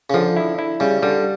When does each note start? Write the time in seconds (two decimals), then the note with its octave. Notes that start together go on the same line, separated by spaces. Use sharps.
0.10 C#3
0.14 D3 F3
0.36 E4
0.58 E4
0.80 C#3 G3
1.02 D3 G3